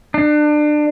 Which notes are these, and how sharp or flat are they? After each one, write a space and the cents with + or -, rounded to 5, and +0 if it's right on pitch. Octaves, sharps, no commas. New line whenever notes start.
D4 +30